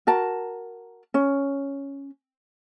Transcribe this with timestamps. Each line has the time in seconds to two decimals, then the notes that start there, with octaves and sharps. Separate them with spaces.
0.07 F#4 A#4 A5
1.14 C#4